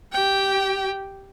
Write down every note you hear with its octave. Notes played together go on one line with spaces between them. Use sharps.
G4 G5